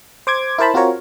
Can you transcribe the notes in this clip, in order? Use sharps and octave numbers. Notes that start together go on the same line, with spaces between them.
C5 D6 G#6
E4 A#4 C5 A5 B5
C4 F4 F#4 A#4 C#5